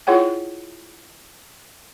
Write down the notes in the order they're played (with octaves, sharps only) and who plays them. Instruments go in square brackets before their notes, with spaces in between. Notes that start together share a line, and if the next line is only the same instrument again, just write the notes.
[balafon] E4 F4 G#4 C#5 F#5 G5